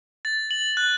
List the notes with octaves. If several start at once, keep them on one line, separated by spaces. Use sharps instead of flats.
A6
F#7
F#6